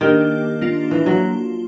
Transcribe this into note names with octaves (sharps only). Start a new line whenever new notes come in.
D#3 A#3 D4 G4
A#3 D4 F4
E3
F#3